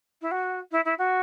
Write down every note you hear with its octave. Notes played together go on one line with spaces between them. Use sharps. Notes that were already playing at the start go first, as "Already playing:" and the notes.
E4
F#4
E4
E4
F#4